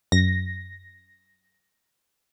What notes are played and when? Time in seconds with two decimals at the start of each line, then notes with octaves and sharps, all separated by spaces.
0.12 F#2 A#6